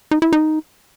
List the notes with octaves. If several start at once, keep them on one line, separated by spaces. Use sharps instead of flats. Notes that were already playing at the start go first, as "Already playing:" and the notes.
D#4
E4
D#4